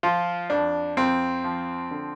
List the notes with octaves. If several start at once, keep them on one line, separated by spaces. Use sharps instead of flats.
F3 F4
F2 D4
F2 C4
F3
D3